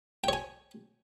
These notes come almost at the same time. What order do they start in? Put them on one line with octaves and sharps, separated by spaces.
G5 C#5 G#5